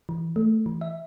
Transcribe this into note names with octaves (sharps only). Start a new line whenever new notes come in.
E3
A3
E3
E5